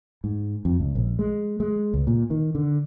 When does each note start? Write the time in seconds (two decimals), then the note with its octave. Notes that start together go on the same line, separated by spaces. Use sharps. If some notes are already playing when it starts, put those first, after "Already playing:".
0.24 G#2
0.65 F2
0.80 C#2
0.95 A#1
1.19 G#3
1.60 G#3
1.94 C#2
2.07 A#2
2.30 D#3
2.55 D3